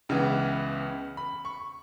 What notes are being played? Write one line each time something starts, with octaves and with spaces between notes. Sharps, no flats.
C#2 C#3 E3 B3
B5
C#6